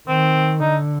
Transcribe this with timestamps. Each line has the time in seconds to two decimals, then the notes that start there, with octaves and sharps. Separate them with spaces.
0.08 D#3 C4
0.59 D3 D#4